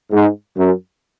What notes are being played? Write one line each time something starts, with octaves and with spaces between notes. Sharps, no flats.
G#2
F#2